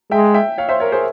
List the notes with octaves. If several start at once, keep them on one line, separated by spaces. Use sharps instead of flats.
G#3 E5 G5
E5 G5
C#5 F5
C5 E5
A#4 C#5
G#4 C5